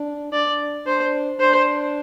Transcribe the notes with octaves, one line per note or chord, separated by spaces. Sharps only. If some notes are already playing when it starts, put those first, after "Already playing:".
Already playing: D4
D4 D5
D4 C5
D4 C5